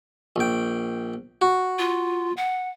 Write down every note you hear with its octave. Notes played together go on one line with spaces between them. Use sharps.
A#1 G5
F#4
F4
F#5